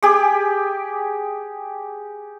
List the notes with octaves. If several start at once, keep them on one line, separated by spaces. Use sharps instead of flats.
G4 G#4 D6